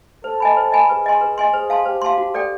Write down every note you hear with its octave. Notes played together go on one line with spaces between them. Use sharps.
A4 C5
D#5 G#5 B5
C5
D#5 G#5 B5
G#4 B4
D#5 G#5 C6
B4
D#5 G#5 C6
G#4 C5
F5 A5 C6
G4 C5
F5 A5 C6
F#4
A4 D5 G5